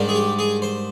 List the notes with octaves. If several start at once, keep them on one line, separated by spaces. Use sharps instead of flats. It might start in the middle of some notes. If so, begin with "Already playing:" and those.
Already playing: G#2 D#3 G3 D4
G#4
G4
G#4
C5